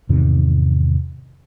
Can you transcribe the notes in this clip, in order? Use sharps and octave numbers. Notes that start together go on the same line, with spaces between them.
E2 G#2 C3 D#3